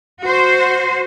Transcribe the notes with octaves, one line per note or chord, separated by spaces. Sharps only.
F#4 C5